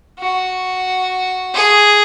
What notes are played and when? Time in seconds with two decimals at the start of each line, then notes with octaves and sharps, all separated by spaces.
0.19 F#4
1.54 G#4